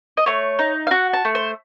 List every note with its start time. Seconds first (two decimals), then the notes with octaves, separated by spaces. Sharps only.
0.17 D#5
0.26 A3 C#5
0.59 D#4
0.87 F5
0.91 F#4 F#5
1.13 A5
1.25 A3
1.35 C5